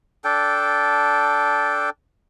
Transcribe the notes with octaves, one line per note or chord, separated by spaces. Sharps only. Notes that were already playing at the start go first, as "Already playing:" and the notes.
D4 A4 G5